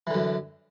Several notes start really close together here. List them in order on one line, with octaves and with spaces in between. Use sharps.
E3 D3 F#2